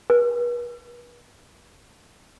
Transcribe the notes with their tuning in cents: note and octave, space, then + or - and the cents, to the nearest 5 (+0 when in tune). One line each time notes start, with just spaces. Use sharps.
B4 -40